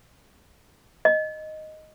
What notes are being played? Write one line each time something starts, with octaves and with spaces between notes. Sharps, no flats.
D#5